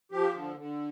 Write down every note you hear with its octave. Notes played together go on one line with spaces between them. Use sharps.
F3 G4
D3
D3